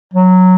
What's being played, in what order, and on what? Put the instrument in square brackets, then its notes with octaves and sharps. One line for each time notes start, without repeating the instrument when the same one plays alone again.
[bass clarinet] F#3